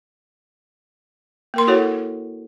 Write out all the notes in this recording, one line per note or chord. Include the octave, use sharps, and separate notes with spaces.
A#3 A#4 C6
E4 F#4 A4 C#5 F#5